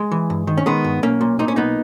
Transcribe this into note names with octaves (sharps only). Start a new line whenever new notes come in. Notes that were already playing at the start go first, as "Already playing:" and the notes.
Already playing: G#3
E3
G2
D#3
C#4
D#3 G#3 B3
G2
B1 A#3 C#4
A#2
A#2 D#4
C#4
B1 B3 D#4